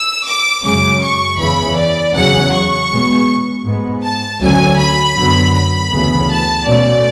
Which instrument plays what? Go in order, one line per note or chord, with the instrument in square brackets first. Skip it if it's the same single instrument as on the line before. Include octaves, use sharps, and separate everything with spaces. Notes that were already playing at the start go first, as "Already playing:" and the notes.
Already playing: [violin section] E6
D6
[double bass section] F#2 C#3 G#3 C#4 [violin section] D6
[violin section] C#6
[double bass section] E2 C#3 E3 [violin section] B5
[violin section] D5
[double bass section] E2 C#3 F#3 C#4 [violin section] F#5
[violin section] C#6
[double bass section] B2 G#3 B3
G#2 G#3 B3
[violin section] A5
[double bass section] D2 D3 F#3 C#4 [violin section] G#5
[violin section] B5
[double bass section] F#2 D3 F#3 B3
[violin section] B5
[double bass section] D2 C#3 E3 B3
[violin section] A5
[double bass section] B2 A3 C#4 [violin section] D5